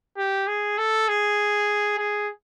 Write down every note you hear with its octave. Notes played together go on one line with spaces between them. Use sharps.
G4
G#4
A4
G#4
G#4